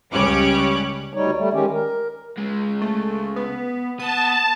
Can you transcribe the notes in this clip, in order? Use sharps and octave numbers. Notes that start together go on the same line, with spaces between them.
C#2 G3 C#4 C#5 D6 F#6
D2 G3 D#4 C#5
G3 A3
D#3 G#3 C#4 G4
A#4
C#2 G#3
A3
B3
B3 A5 D#6